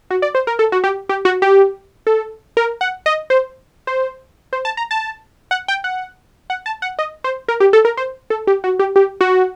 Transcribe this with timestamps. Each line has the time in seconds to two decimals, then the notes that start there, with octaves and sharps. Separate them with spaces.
0.10 F#4
0.22 D5
0.35 C5
0.47 A#4
0.59 A4
0.72 F#4
0.84 G4
1.09 G4
1.25 F#4
1.42 G4
2.07 A4
2.57 A#4
2.81 F#5
3.06 D#5
3.30 C5
3.87 C5
4.53 C5
4.65 A5
4.77 A#5
4.91 A5
5.51 F#5
5.68 G5
5.84 F#5
6.50 F#5
6.66 A5
6.82 F#5
6.99 D#5
7.24 C5
7.48 A#4
7.60 G4
7.73 A4
7.85 A#4
7.97 C5
8.30 A4
8.47 G4
8.64 F#4
8.79 G4
8.96 G4
9.21 F#4